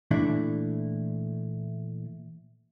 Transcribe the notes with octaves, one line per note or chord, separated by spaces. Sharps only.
A#2 E3 A3 D4 E4